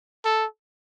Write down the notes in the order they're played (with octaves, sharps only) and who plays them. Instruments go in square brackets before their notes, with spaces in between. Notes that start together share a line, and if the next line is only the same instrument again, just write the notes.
[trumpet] A4